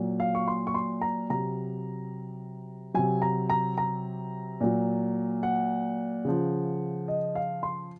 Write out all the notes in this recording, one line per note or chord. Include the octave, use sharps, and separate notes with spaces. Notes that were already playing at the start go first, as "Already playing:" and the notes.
Already playing: A#2 F#3
F5
C#6
C6
C#6
C6
A#5
C3 F#3 A#5
C3 F#3 G#5
A#5
A#5
A#5
A#2 F#3
F#5
C#3 F3
D#5
F5
C6